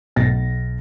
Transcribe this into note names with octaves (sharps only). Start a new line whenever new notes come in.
B1 A6 A#6